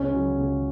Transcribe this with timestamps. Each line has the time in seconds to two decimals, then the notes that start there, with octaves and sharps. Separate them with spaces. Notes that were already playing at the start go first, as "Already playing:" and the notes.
Already playing: C#2 C#4
0.13 C#3 F#3
0.38 C#2